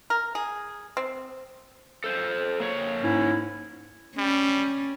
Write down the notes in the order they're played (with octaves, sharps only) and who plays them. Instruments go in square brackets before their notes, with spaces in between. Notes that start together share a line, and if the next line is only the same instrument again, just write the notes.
[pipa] A#4
G#4
C4
[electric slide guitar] A4 C5
A#3 C#5
[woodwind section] G#2 C#4 E4
[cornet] G3 [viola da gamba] C#4